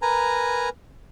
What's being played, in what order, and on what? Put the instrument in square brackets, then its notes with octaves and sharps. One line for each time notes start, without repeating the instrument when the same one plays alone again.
[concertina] A#4 B4 G#5 A#5